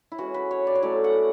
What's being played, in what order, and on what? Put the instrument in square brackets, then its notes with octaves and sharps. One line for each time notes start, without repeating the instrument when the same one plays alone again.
[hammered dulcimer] E4
E3 G#3 C#4 F#4
B4
C#5
D5
C#5
A2 F#3 A3 C#4 D5
F#5